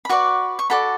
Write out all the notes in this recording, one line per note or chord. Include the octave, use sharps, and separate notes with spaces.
B5
F#4 B4 D5 C#6
C#6
F#4 A4 D5 B5